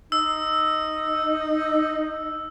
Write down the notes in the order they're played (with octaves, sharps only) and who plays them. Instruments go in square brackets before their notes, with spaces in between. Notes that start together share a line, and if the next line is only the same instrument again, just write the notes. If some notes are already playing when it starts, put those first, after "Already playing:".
[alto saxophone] D#4 [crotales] E6